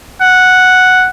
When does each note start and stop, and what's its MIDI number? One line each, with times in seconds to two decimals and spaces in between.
0.21 1.07 78